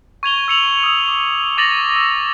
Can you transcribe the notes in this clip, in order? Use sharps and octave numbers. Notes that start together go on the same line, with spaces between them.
C#6 G#6 F7 G7
E6 C#7 F7 F#7
D#6 E6
D6
C#6 D6 A6 A#6 F7 F#7
E6 F#7